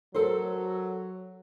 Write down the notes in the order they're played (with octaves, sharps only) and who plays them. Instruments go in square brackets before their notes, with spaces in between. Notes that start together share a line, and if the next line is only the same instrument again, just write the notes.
[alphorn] F#3 [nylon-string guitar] A4 A#4 C5